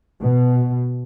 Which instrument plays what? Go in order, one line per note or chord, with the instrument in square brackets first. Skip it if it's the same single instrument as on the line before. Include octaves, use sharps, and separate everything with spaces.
[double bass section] B2